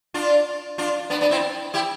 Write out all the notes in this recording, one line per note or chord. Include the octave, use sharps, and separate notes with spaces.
D4 F4
D4 F4
B3 D4
B3 D4
C4 E4
E4 G4